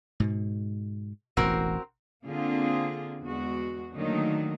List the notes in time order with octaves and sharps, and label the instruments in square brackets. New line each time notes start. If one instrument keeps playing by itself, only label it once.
[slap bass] G#2 B2
[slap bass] E1 A1 E3 [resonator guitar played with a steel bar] C4 F#4 A#4
[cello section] D3 A#3 C4 F4 G#4
E2 G#3 F#4
D3 D#3 F#3 A3 A#3 D#4